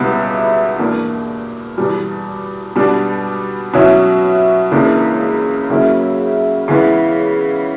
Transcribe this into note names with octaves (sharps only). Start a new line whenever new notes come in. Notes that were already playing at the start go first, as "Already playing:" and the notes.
Already playing: C#2 B2 G3 B3 E4
E2 B2 A#3 D4
E2 B2 G3
B2 G3 B3 D4
B2 F#3 C#4 E4
C#2 C#3 E3 A#3 D4
C#3 F#3 A#3 C#4 E4
C#3 E3 B3